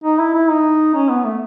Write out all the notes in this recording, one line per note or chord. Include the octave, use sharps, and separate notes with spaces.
D#4
E4
E4
D#4
C#4
B3
A3